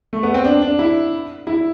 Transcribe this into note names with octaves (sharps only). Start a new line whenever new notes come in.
A3
B3
C4
D4
D4
E4
E4